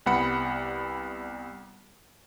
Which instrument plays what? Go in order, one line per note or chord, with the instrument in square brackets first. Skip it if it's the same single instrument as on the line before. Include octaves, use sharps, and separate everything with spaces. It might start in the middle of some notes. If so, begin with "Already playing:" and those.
[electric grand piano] C2 G3 B3 F#5 B5 C#7